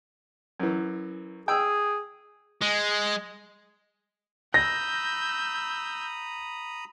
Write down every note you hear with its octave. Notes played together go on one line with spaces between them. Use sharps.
F#2 E3
G#4 G5 E6
G#3
A#5 B5 D#6 E6 G6 A#6